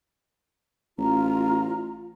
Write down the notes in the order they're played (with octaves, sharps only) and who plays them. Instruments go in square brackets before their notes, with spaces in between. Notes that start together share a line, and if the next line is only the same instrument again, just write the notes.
[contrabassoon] A1 [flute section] F4 A#5